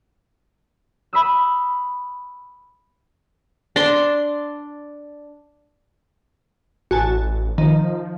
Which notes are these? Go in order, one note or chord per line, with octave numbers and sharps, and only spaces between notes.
B5 D#6 E6
D4 C6
A1 F#4 G#5 A5
D#3 F3